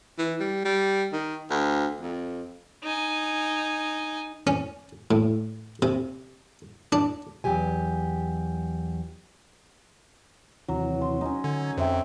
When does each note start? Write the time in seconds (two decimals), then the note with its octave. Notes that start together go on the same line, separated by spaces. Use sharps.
0.18 E3
0.40 G3
0.65 G3
1.13 D#3
1.50 D2
2.00 F2
2.84 D#4 G#5
4.47 C#4
5.11 A2
5.82 C3
6.92 D4
7.44 E2 A#2 F#3 G4 G#5
10.68 D#2 C3 E3 F#3
11.01 C6
11.21 C#4 D#4
11.44 D3 G#5
11.77 F2 C5 E5 G5